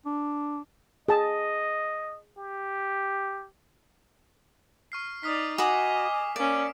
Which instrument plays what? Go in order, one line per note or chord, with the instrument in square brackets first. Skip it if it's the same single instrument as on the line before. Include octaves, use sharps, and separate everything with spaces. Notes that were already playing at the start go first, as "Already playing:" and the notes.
[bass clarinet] D4
[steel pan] G#4 A5 [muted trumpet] D#5
[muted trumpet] G4
[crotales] C#6 F6 C7
[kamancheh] D#4 D5 [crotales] D#6 F6 B6
[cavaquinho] F#4 B5 D#6 [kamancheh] D#5 [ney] G#5 [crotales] D6
[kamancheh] A#3 C#4 [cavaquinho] D5 [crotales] D7